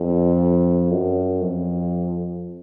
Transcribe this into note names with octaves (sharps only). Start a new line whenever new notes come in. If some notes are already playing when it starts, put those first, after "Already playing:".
Already playing: F2
F#2
F2